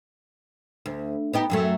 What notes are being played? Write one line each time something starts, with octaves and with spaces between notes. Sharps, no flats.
D2
B3 D#4 G4
F#2 F#3 A3